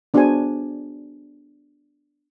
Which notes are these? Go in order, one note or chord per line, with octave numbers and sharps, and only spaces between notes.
B3 D4 F#4 G#4 C5 G#5